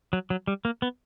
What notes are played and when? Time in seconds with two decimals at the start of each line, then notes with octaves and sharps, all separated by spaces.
0.13 F#3
0.30 F#3
0.47 G3
0.65 A#3
0.82 B3